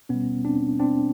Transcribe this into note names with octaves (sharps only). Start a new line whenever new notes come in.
B2 G3 B3 C#4
C4 D4
C4 D4